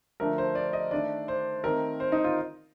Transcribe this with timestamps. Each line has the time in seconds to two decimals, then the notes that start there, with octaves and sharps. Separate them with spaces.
0.20 D3 F3 A3 D4 A#4
0.38 C5
0.55 D5
0.73 D#5
0.91 D#3 A3 D4 D5
1.28 C5
1.64 D#3 A3 C4 A#4
2.00 C5
2.12 D#4
2.24 F4